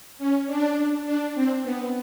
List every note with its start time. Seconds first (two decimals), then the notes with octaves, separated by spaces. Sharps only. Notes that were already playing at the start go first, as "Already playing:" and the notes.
0.18 C#4
0.47 D4
1.06 D4
1.35 C4
1.63 B3